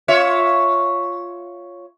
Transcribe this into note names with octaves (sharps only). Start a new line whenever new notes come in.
F4 C#5 E5